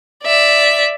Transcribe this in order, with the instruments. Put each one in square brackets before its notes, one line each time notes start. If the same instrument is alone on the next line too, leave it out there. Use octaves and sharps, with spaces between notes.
[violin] D5 E5